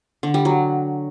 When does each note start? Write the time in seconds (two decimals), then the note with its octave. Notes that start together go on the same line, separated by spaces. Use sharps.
0.23 D3
0.34 G3
0.45 F#3